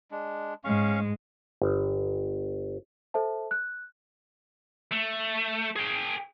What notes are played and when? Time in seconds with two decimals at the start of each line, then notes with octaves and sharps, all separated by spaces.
0.11 G#3 D4
0.64 G#2 G#3 C#4 F5 C#6
1.62 G1
3.14 A4 C5 E5 A5
3.51 F#6
4.91 A3
5.76 G#4 G5